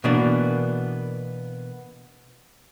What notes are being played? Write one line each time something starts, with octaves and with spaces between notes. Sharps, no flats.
B2 E3 A#3 B3 D4